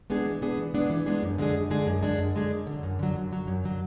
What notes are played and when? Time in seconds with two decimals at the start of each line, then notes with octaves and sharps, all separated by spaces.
0.10 G#3 B3 D4 G#4
0.26 E3
0.41 G#3 B3 D4 G#4
0.58 E3
0.74 G#3 B3 D4 G#4
0.90 E3
1.06 G#3 B3 D4 G#4
1.23 F#2
1.38 D3 G#3 D4 G#4
1.55 F#2
1.70 D3 G#3 D4 G#4
1.87 F#2
2.03 D3 G#3 D4 G#4
2.19 F#2
2.35 D3 G#3 D4 G#4
2.51 F#2
2.67 D3 F#3
2.83 F#2
2.99 D3 F#3
3.16 F#2
3.31 D3 F#3
3.47 F#2
3.64 D3 F#3